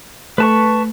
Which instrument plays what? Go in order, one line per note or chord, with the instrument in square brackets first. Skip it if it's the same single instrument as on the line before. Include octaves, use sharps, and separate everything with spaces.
[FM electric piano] A3 [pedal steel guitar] B4 A5 C#6